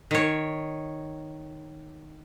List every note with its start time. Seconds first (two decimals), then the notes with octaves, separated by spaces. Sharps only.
0.11 D#3 C#5